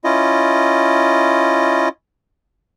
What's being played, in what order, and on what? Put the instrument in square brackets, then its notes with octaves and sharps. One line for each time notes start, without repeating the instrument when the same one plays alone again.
[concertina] C#4 E4 F4 D#5